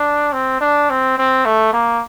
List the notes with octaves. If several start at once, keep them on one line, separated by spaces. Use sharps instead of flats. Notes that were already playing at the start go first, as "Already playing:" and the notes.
Already playing: D4
C4
D4
C4
C4
A3
A#3